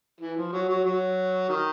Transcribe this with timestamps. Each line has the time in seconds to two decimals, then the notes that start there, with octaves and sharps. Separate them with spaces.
0.21 E3
0.36 F3
0.53 F#3
0.69 F#3
0.85 F#3
1.49 D#3